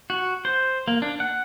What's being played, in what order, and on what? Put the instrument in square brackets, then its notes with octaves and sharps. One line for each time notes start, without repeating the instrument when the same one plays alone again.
[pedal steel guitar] F#4
C5
A#3
D4
F#5